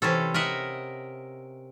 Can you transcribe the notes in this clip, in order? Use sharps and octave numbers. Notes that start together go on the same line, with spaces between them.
C3 E3 C#4 A4
A#4 D#5 E5 F#5